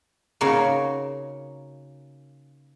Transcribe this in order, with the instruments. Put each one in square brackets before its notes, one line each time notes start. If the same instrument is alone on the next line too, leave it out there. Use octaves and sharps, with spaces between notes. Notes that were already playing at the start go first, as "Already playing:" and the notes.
[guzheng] C#3 A#3 D#4 F#4